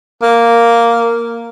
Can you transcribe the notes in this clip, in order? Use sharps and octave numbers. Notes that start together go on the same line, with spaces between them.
A#3